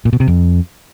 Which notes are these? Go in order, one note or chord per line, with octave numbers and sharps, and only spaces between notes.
A#2
B2
C3
F2